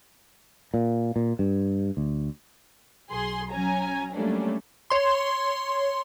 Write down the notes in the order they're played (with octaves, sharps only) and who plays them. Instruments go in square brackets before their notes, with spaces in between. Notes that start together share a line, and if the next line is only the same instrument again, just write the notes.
[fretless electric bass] A#2
A#2
G2
D2
[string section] B1 G#4 C6
F#3 C#4 G#5 A#5
F#3 G3 A3 A#3 C#4 D4
[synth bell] C#5 C6